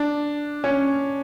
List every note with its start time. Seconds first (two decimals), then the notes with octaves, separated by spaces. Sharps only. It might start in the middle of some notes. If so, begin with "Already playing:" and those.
Already playing: D4
0.64 C#4